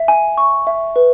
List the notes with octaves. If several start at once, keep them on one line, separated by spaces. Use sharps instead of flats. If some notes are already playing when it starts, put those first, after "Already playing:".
Already playing: E5
G#5
C#6
E5
B4